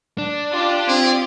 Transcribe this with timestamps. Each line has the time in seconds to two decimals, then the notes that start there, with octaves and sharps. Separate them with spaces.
0.18 D4
0.52 F4 G4 D5
0.88 C4 G#4